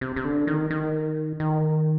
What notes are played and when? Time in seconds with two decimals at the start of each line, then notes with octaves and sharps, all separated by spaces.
0.01 C3
0.16 C3
0.25 D3
0.47 D#3
0.71 D#3
1.40 D#3